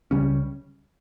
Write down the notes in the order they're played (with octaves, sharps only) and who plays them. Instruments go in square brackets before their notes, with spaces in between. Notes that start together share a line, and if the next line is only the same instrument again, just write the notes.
[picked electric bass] C#2 C#3 G3 C#4